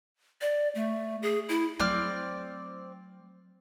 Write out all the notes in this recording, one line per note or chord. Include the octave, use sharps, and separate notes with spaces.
D5
A3
G#4
E4
F#3 A3 C4 D5 F6